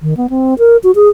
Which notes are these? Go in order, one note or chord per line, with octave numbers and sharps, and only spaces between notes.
D#3
B3
C4
A#4
F#4
G#4